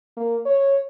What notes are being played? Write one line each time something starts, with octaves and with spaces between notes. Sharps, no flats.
A#3
C#5